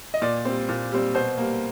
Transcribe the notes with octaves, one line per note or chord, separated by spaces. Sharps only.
D#5
A#2 D5
G3 C4
A#2
G3 C4
B2 C5
G3 A#3